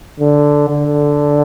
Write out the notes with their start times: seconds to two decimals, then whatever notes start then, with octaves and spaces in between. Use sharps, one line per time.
0.20 D3
0.69 D3